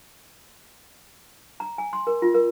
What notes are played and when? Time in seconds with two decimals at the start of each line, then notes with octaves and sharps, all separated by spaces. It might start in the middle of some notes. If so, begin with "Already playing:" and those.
1.60 A#5
1.78 G#5
1.93 C6
2.07 A#4
2.22 F4
2.34 A#4